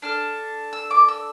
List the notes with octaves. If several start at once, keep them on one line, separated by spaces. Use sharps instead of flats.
D4 A4 F6
E6
D6
E6